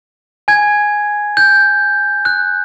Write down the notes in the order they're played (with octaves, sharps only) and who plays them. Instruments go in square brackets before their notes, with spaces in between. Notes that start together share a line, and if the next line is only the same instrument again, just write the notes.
[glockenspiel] G#5 G#6
G6
F#6